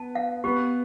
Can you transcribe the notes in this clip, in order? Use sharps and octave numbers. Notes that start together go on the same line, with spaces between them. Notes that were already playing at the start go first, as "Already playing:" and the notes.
Already playing: B3 A5
F5
B3 G4 B4